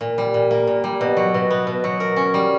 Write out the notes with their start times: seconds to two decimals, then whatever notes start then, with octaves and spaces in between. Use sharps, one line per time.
0.01 A#2
0.18 G3
0.34 A#2
0.51 A#3
0.67 A#2
0.84 G3
1.01 B2
1.17 F#3
1.34 B2
1.50 B3
1.67 B2
1.84 F#3
2.00 A#4
2.16 C#4
2.34 G3